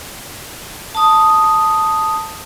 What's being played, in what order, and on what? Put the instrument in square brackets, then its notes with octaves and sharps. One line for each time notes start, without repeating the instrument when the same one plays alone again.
[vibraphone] A5 D#6